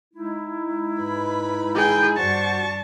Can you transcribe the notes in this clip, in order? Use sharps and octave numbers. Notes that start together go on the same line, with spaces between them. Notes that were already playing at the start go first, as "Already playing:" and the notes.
G#3 D#4 E4
G#2 B4 B5
G#4 G5
G2 D4 F#4 C5 F#5 A5 C#6